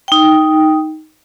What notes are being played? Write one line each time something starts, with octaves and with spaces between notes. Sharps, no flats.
D#4 G5